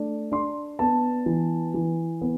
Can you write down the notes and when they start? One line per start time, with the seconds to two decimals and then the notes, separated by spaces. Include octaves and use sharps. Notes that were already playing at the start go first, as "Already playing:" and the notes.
Already playing: A3 D4
0.32 D4 C6
0.79 B3 A5
1.26 E3
1.74 E3
2.21 B3